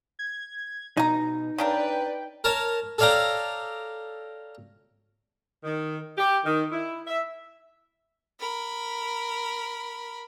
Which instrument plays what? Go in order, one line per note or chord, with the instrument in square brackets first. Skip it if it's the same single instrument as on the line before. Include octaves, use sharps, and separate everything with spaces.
[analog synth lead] G#6
[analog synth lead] B2 [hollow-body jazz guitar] D#4 [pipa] G#5 A#5
[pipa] C#3 D4 A#4 [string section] B4 D5 [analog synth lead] G5
[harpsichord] A#4 C#5 A5
A4 C#5 D5 F5 G5 A#5
[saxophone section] D#3
G4
D#3
E4
E5
[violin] A#4 B5